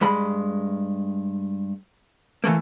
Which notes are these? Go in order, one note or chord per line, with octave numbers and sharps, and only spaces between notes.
G2 G#3 B5
E3 A3 A#3